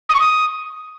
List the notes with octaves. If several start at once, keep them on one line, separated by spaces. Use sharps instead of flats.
D#6
C#6
D#6